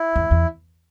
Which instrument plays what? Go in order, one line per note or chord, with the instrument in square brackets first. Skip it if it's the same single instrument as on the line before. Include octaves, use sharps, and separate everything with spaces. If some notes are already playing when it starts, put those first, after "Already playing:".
Already playing: [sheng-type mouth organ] E4
[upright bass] E2
E2